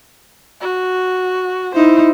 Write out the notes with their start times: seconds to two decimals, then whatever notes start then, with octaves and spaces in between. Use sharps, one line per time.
0.61 F#4
1.75 D#4 E4 C5